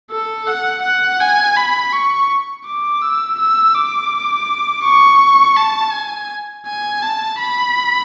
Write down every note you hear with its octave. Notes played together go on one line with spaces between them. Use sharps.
A4
F#5
F#5
G#5
B5
C#6
D6
E6
E6
D6
C#6
A5
G#5
G#5
A5
B5